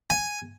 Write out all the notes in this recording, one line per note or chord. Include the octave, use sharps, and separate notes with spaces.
G#5